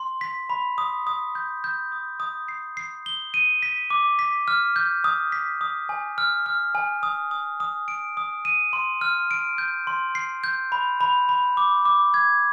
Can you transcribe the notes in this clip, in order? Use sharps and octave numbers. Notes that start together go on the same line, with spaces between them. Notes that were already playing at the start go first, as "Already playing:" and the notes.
Already playing: C6
B6
B5
D#6
D#6
G6
G6
D#6
D#6
C7
C7
G7
D#7
B6
D6
B6
F6
G6
D#6
B6
D#6
G#5
F6
F6
G#5
D#6
D#6
D#6
D7
D#6
D#7
C6
F6
D7
G6
C6
C7
G6
B5
B5
B5
D6
D6
G#6